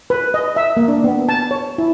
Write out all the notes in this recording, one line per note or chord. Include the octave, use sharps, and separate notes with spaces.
B4
D#5
E5
A#3
D4
B3
A5
C#5
E4